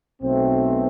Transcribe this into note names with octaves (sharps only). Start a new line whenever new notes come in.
B1 B2 A3 C4